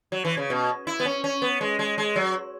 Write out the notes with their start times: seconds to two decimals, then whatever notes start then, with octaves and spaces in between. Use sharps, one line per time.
0.12 F#3
0.25 E3
0.37 C#3
0.50 B2
0.87 E4
1.00 B3
1.05 C#4
1.24 C#4
1.42 B3
1.61 G#3
1.79 G#3
1.98 G#3
2.16 F#3